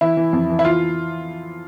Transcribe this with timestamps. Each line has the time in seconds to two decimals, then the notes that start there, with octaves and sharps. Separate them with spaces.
0.01 E3 E4
0.17 E3
0.33 F2
0.50 E3
0.59 E4
0.65 E3 F4